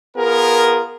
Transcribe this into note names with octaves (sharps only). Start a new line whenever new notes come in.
B3 F4 G#4 A#4